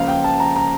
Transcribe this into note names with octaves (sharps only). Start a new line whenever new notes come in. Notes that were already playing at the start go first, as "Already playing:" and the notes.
Already playing: C#2 C#3 F3 A#3 F5
G5
A5
A#5
A#5